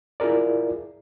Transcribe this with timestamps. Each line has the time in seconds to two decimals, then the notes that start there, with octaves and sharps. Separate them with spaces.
0.20 E4 F4 G#4 A#4 D5